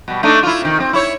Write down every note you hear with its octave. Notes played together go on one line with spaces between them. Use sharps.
B2 G3
A3 D4 D#4
E4 F4
C3 D#3
C4
E4 C#5